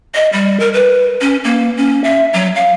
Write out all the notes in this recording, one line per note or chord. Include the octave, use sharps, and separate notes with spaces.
D#5
G3
A#4
B4
C#4
A#3
C#4
E5
F#3
F5